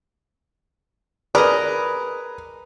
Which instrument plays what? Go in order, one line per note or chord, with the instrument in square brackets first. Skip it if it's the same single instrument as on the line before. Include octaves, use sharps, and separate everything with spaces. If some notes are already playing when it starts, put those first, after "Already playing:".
[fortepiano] G#4 B4 [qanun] A#4 D#5 [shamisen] D5